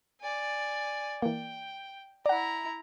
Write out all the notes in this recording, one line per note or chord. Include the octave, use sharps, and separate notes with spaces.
D5 G#5
E3 A#3 G5
E4 D5 F#5 A#5